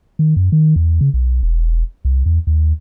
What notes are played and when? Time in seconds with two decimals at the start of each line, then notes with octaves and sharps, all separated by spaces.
0.19 D#3
0.36 F#2
0.52 D#3
0.76 E2
1.01 C#3
1.14 B1
1.43 E1
2.05 C2
2.26 E2
2.47 D#2